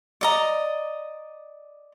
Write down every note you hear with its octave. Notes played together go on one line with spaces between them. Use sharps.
D5 D#5 A#5